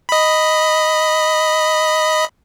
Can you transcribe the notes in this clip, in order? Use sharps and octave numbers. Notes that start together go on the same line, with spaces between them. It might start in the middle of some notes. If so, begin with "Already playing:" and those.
D#5 B5